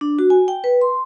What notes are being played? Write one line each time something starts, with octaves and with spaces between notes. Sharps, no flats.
D4
F#4
G#5
G5
B4
C6